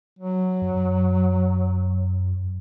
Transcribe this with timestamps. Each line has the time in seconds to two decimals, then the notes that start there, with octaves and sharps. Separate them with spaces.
0.19 F#3
0.62 F#2